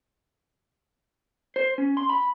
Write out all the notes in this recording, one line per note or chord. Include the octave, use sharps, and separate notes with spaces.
C5
C#4
C6
B5